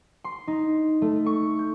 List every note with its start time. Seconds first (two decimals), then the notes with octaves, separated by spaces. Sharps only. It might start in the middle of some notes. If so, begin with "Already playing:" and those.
0.24 C6
0.48 D#4
1.02 A3
1.26 C#6
1.59 G6